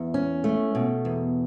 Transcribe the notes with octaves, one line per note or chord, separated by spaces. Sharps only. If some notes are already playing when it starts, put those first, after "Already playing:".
Already playing: E2
C#4
A3
B2
E2